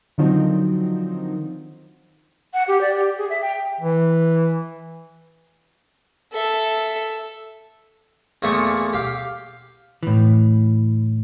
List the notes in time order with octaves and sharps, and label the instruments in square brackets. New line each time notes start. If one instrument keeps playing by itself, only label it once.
[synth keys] D3 D#3 F3 F#3 C4 D#4
[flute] F#5
G4
D5
G4
G#4
E5
G5
[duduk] E3
[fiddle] A4 E5
[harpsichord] E2 A#2 A3 C#6 D#6
G4 F5
[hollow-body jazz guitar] A2 E3